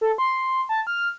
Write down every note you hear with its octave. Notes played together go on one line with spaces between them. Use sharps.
A4
C6
A5
F6